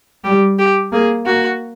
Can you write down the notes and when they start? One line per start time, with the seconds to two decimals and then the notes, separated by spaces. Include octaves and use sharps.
0.24 G3 G4
0.59 G4
0.92 A#3 G#4
1.26 A#3 F#4